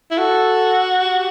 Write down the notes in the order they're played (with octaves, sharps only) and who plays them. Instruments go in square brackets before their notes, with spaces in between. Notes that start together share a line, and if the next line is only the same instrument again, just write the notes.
[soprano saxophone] E4
[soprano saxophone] F#4 [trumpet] A4
[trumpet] G4